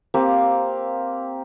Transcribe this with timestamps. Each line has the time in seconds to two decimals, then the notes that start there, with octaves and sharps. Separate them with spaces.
0.14 A#3 C4 G4